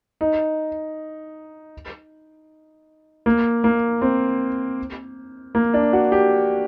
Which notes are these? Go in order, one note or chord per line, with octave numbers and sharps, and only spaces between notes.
D#4
A#3
A#3
C4
A#3
D4
F#4
G4